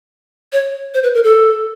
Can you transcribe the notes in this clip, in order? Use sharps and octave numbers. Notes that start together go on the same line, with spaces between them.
C#5
C5
B4
A#4
A4